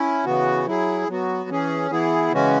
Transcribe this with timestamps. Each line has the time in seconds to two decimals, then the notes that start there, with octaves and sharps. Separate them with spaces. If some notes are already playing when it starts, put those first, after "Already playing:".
Already playing: C#4 E4
0.25 C#3 E3 B3 F#4
0.67 F#3 E4 G#4
1.08 F#3 B3 F#4
1.50 E3 C#4 G#4
1.91 E3 B3 E4 G#4
2.32 C#3 E3 G#3 C#4 F#4